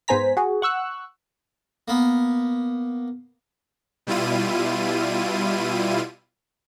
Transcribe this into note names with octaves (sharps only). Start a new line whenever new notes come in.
G#2 B3 C5 G#5 A#5 B6
F#4 G#4
F#5 C#6 E6 F#6
A#3 B3
B2 G3 E4 F4 D#7